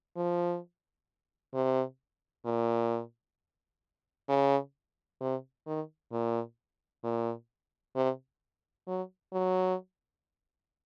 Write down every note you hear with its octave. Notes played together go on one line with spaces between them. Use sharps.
F3
C3
A#2
C#3
C3
D#3
A#2
A#2
C3
F#3
F#3